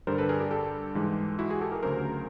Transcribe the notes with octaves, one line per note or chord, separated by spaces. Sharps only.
G2 D3 G3 A#4 C5
A4 B4
G#4 A#4
G4 A4
G4 A4
G#2 E3 G#3
E4 F#4
F#4 G#4
G4 A4
G#4 A#4
D2 C#3 F#3 A#4 C5